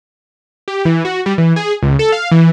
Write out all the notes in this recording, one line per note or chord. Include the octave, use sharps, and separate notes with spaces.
G4
E3
F#4
G3
E3
G#4
C#2
A4
F5
E3